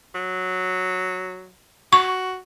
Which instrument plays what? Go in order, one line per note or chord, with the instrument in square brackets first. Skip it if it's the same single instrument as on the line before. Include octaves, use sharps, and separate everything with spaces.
[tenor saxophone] F#3
[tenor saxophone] F#4 [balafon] C#6